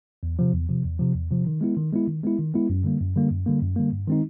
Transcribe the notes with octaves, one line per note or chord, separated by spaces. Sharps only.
E2
C3 F3
E2
C3 F3
E2
C3 F3
E2
C3 F3
D#3
G#3 B3 E4
D#3
G#3 B3 E4
D#3
G#3 B3 E4
D#3
G#3 B3 E4
F#2
D3 G3 A#3
F#2
D3 G3 A#3
F#2
D3 G3 A#3
F#2
D3 G3 A#3
G2
D#3 G#3 C4 D#4